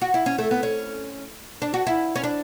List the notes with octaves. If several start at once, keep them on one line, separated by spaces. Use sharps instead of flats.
F#4
E4
C#4
A3
B3
C#4
D4
F#4
E4
C#4
D4